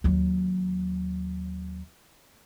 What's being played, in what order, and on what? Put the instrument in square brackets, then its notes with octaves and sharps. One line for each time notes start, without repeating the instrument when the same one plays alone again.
[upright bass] D#2 F#3